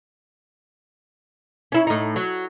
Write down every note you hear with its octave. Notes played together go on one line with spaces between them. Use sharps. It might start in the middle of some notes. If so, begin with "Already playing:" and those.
C#4 E4
A2 D#4
F#3